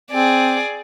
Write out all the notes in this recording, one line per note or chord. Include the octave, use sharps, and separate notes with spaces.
C4 G#4 D5